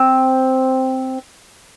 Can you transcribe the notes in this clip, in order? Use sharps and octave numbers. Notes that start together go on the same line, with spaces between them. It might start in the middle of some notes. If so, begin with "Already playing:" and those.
Already playing: C4